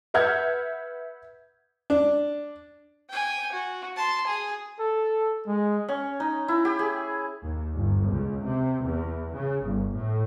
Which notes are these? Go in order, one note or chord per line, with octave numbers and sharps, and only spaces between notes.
B4 E5 F#5 F6 G6 G#6
D4
G5 G#5
F#4
A5 C6
G#4
A4
G#3
C#4
D#4
E4
G4
G#4
D#2
G1
C#2
C3
E2
C#3
G1
A2